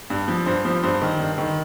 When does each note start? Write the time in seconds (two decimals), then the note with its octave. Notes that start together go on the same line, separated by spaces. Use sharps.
0.10 G2
0.28 F3
0.46 G2 C5
0.65 F3 C5
0.83 G2 C5
1.01 D#3
1.20 G2
1.38 D#3